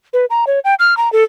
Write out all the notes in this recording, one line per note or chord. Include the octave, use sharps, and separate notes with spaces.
B4
A#5
C#5
G5
F6
A#5
A4